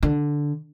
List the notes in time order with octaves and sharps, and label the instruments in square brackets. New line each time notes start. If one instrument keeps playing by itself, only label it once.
[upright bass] D3